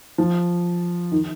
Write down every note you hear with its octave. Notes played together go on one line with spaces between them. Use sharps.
F3
D#3